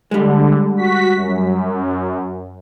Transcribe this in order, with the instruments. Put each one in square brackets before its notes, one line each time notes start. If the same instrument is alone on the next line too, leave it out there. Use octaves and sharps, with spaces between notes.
[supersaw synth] D3 [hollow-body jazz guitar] G3 G#3
[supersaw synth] F#4 B6
F#2